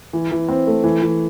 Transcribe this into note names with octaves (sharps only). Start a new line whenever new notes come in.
E3
E3
C4
A3
E3
E3